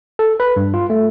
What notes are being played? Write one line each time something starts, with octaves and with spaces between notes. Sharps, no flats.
A4
B4
G2
F4
A3